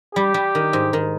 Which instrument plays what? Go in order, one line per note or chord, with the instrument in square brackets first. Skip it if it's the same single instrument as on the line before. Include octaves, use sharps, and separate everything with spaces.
[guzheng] G3 [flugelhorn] G4
[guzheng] G3
D#3
G#2
D#3